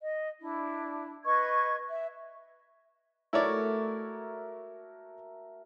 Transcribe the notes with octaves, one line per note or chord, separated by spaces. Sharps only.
D#5
D4 E4
B4 D#5 C#6 G#6
E5
A3 E4 F#4 A#4 C#5 D5